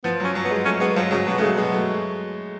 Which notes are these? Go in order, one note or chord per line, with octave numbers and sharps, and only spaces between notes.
F3 B3
F#3 C#4
F#3
B3
G#3
A3 C#4
G#3 B3
F3 F#3
C#3 F#3
B2 F#3
C#3 G#3 A3
B2
G#3
A3